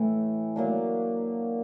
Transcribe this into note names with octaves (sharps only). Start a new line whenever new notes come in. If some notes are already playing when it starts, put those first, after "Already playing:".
Already playing: A2 E3 A3
F#3 A#3 D4